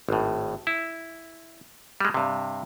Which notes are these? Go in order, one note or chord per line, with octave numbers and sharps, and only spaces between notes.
G#1 A2
E4
G3 G#3
G2 C3